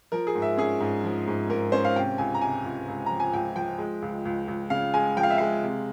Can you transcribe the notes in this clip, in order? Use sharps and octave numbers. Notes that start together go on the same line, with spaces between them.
F3 A#4
G#4
G#2
E5
C#4 G#4
G#2
F3
G#2
G#2 A#4
C#4 C5
F5
C3 G5
C#2 G#5
A#5
C3 G#5
C#2
C#2
F3 A#5
G#5
C#2 G5
F3 G5
G#3
C#2
C#2
C#2
C#3 F5
G#3 G#5
F3 G5
F5
E5
G#3 F5
C3